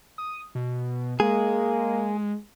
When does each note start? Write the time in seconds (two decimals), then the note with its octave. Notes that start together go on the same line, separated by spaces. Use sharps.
0.18 D#6
0.55 B2
1.20 G#3 A#3 G#4